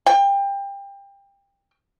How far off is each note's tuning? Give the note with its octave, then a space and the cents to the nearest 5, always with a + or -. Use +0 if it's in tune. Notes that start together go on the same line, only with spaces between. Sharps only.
G5 +25